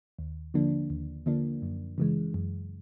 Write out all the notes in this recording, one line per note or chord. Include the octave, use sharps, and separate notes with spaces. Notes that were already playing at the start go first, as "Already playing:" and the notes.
D#2
D3 F3 A#3 D4
D#2
D3 F3 A#3 D4
F#2
C#3 E3 G#3
F#2